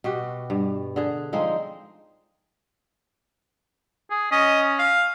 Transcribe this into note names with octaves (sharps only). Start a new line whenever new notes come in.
B2 F#4 G4
G2
D3 G#4
F3 G#3 C4 D#4
G#4
C#4 D#5
F5